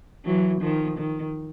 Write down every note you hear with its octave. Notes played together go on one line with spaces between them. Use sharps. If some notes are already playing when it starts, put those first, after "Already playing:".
E3 F#3
D#3 F3
D#3